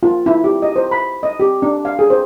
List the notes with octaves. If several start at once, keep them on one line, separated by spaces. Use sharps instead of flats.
F4
E4
G4
D#5
C5
B5
D#5
G4
D4
F5
G#4
C5